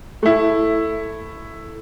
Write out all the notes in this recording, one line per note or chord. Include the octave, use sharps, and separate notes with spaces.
A3 E4